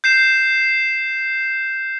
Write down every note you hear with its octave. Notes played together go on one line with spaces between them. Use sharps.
G6 C7 E7